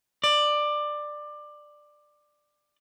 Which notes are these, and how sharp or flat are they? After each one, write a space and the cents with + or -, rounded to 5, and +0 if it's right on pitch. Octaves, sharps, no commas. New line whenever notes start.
D5 +15